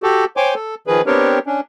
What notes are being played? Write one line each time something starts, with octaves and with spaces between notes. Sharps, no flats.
F#4 G4 A4
C5 C#5 G5 G#5 C6 D6
A4
D#3 F3 G#4 B4
B3 C4 D4 G4 A#4 C#5
C#4 D4